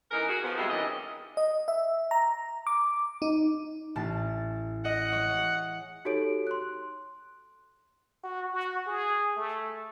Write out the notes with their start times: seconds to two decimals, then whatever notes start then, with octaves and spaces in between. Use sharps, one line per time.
0.11 E3 C#4 D#4 A#4
0.29 F#4 G#4
0.44 F3 B3
0.57 F2 G3 G#3 E4 F4 E5
0.69 D#3 E3 C#4 D5 D#5
1.37 D#5
1.68 E5
2.11 A#5
2.67 D6
3.22 D#4
3.95 A1 A5
4.85 D#5 F#5
5.12 G#3 C#5
6.05 D#4 F#4 G4 A4 C#5 D7
6.47 C6 F#6
8.24 F#4
8.54 F#4
8.87 G#4
9.37 A3